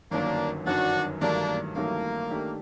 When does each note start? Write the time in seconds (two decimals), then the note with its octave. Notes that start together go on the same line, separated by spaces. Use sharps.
0.11 G1 F#2 D#3 F#3 A#3 D4
0.66 G1 F#2 D#3 F#3 D4 F#4
1.21 A1 G2 D#3 F#3 A3 A#3 D4
1.75 A1 G2 D#3 F#3 A3 A#3
2.30 D#3 A3 D4 G4